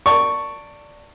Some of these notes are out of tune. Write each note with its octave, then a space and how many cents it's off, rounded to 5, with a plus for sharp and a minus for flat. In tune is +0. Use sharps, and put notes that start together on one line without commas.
D5 +0 A5 +25 C#6 +0